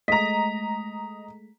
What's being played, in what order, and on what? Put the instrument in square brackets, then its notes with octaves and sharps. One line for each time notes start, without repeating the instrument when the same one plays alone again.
[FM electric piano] G#3 A3 [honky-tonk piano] D#5 A#5 [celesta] B6